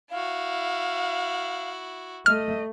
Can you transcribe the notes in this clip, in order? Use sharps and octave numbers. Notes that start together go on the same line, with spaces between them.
E4 F#4 F5
A3 D#5 F6